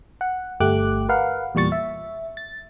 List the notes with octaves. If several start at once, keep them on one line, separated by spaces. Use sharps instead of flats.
F#5
G1 A3 G4 D6 F#6
A#4 B4 F5 F#5
E2 A#2 G3 C#6 A6
E5
A6